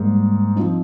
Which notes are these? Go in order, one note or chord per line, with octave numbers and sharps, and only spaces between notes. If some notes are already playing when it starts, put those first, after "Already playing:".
Already playing: G#2 G3 A#3
F3 C4 D#4